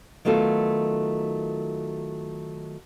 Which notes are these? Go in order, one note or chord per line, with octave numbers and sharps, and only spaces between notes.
D#3 F#3 A3 B3 F4 A4